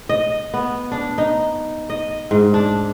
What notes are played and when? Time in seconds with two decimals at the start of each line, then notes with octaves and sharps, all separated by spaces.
0.09 D#5
0.54 B3
0.92 D4
1.18 D#4
1.90 D#5
2.31 G#2
2.54 D4